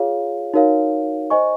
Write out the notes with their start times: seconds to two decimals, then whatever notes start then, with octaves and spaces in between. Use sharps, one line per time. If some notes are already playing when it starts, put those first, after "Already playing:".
Already playing: F4 G#4 C#5 F5
0.54 D#4 F#4 A#4 C#5 F5
1.30 C5 D#5 G#5 C#6